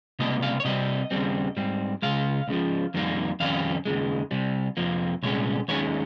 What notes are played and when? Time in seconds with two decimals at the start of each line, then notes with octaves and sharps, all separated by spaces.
0.19 C#2 C3 G3 A#3 D#5
0.42 F5
0.60 C#5
0.65 C3 G3 C4 D#5
1.11 D#2 C#3 G3 C4
1.57 G#2 G3 C4
2.02 C#2 C#3 G#3 F5
2.48 C#2 C#3 F3
2.94 F2 D#3 G3 A#3
3.40 F2 D#3 G3 C#4 F5
3.85 D#2 C#3 G#3
4.31 C2 C3 G3
4.77 F2 C3 F3 A#3
5.23 C2 A#2 G#3 C#4 C#5
5.68 D#2 D#3 G#3 C#4 C#5